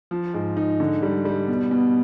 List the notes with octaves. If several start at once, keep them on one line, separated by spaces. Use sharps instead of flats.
F3
G#2
D#4
D3
G3
G3
B2
B2